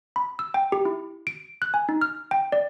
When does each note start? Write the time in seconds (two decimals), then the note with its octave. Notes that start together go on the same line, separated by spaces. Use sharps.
0.16 B5
0.39 E6
0.54 G5
0.72 G4
0.85 E4
1.27 D7
1.62 F#6
1.74 G#5
1.89 D#4
2.01 F6
2.31 G5
2.52 D5